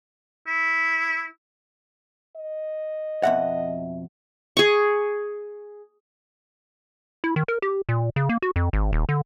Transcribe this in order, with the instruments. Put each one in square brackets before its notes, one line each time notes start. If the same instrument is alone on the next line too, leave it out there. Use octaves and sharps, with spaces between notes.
[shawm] E4
[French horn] D#5
[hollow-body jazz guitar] F2 B2 F#5 [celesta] E5
[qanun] G#4 C#6
[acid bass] E4
D#3
A#4
G4
A#2
C#3
A#3
F#4
F2
G#1
D#1
D3